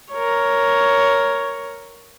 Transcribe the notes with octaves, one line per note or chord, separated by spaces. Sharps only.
A#4 C#5